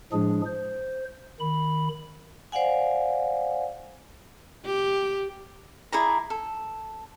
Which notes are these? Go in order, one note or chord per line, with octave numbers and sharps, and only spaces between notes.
A2 F3 G#3 D4 G#4
C5
D#3 B5
C5 D5 F5 F#5 G#5
G4
E4 G#4 D5 A#5
A4